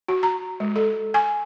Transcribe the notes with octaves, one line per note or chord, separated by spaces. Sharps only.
F#4
A#5
G#3
A4
G#5